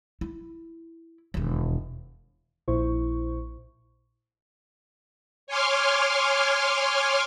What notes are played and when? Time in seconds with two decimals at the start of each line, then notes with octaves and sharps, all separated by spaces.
0.21 E4
1.34 E1 D#2
2.68 A#1 A#2 E4 C5 C#6
5.47 C#5 G#5 C6 D6 F6